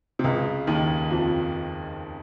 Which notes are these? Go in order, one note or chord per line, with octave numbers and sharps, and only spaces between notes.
C3
C#2 C#3
D#2 D#3
F2 F3